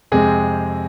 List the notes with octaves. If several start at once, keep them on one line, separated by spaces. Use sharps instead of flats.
F2 C3 G#3 C4 G#4